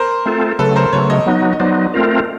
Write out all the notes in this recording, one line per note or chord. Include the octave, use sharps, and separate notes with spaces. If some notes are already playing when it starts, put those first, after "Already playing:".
Already playing: A#4 C5
A3 C4 F4 A4
C#3 F#3 A3 A4 B4
A#4 C5
C#3 F#3 A3 B4 C#5
C#5 D#5
F#3 B3 D#4
D#5
F#3 B3 D#4 C5 D5
A3 C4 F4 A#4